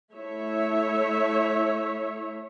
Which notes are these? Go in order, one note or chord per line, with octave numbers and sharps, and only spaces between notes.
A3 E4 C#5 E5